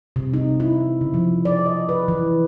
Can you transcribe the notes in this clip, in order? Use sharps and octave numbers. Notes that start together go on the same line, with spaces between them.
C3
D#4
E4
C#3
F3
D5
D#5
B4
E3